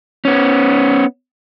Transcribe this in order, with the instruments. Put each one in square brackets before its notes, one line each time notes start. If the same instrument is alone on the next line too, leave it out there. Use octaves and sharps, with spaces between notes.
[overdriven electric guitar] B3 C#4